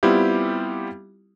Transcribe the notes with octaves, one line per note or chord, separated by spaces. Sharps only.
G3 B3 C4 E4 F4 G4